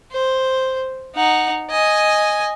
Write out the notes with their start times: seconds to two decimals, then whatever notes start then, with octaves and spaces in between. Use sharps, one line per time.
0.12 C5
1.16 D#4 F#5
1.70 D#5 G#5